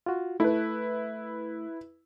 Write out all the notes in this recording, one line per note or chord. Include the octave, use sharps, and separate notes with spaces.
F4 F#4
A3 E4 B4